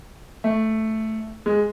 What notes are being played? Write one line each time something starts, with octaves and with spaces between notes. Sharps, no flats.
A3
G#3